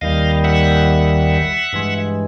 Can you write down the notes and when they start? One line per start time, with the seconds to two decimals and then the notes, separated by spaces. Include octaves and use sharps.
0.01 D#2 D#3 G3 D#5 F5
0.44 E5 F#5
1.73 G2 E3 G#3